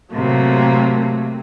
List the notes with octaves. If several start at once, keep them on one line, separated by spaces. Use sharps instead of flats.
A2 C3 F#3 A3 A#3